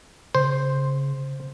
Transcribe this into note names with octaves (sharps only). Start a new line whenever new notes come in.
C#3 C5